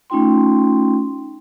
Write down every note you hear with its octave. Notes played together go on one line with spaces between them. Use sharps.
A3 C#4 D#4 F4 G5 C6